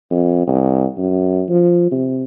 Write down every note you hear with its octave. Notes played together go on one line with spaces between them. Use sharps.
F2
C2
F#2
F3
C3